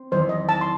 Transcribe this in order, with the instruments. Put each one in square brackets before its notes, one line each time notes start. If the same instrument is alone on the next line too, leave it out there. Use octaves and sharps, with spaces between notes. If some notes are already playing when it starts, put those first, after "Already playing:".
Already playing: [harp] C4
[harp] E2 D#3 F#3 [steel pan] C5
[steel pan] D#5
A5
C6